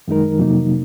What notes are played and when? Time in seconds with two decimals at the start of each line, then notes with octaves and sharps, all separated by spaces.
0.08 F#2 D#3 G#3 D#4 A#4
0.39 F2 C3 F#3 A#3 D#4